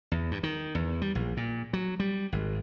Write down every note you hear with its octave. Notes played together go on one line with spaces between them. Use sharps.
E2
G2
D#3
E2
G3
A#1
A#2
F#3
G3
G#1